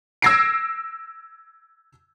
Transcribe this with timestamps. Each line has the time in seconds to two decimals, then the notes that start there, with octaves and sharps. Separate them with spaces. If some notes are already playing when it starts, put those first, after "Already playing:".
0.22 E6 G#6 A#6 C7 D7